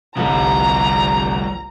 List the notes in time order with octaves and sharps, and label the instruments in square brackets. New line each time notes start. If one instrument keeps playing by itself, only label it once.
[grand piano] G1 C2 [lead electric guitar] F3 G3 [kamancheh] A#5